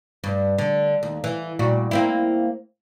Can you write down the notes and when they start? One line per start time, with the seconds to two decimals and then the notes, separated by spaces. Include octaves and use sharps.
0.24 G2
0.58 D3
1.03 D#2
1.24 E3
1.59 A#2 G3 F#4
1.91 A#3 C4 E4